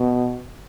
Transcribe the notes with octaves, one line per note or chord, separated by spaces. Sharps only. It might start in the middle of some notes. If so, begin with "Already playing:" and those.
Already playing: B2